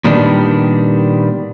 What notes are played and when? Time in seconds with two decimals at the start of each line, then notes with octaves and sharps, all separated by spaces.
0.04 A#2 D#3 G3 B3 D4